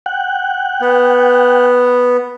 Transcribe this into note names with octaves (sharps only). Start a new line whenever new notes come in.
F#5 G5 F#6
B3